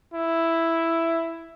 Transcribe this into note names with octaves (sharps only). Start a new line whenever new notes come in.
E4